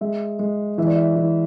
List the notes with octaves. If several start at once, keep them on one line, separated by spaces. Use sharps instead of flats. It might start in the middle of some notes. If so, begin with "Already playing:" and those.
G#3 E5
G#3
E3 E5
D5
E5
E3